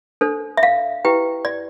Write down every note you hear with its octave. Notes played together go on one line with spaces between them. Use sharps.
D4 A4 C5
E5
F5
E4 G4 B4 G5
D5